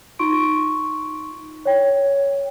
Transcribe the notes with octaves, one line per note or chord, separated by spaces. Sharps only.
D#4 F4 C6 C#6 D7
C#5 G5